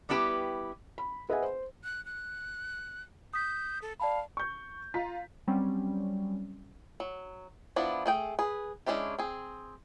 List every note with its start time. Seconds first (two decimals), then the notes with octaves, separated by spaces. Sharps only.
0.09 G3 B3 E4 G4 A4 B4
0.98 B5
1.29 G#4 B4 D#5 E5 F#5 G#5
1.42 C5
1.84 F#6
2.05 F#6
3.34 D#6 G6 B6
3.82 A4
4.00 D5 F5 A5 B5
4.37 C#6 G6
4.94 F4 A#5 B6
5.47 F#3 G3 C4 C#4
7.00 F#3
7.76 F3 B3 D4 E4
8.06 A3 G#4 G5
8.39 G#4 B4
8.86 G#3 C#4 D4 E4 G4
9.19 C4 G#4